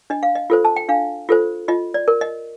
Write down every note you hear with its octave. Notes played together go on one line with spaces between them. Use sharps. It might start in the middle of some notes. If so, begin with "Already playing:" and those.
D4 D#5
F5
D#5
F4 A4 C5
A5
G5
D4 F5
F4 A4 C5
F4 D#5
D5
A#4
D#5